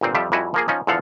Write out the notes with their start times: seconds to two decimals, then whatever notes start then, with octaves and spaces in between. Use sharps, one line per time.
0.01 G1 A#2 C4
0.15 F2 F3 G3 G4 E5
0.32 F2 G3 E4 F#4 E5 G#5
0.54 F3 A#3 G#4
0.68 F3 C#4 D#4
0.87 E2 D3 F3 A4 F5 F#5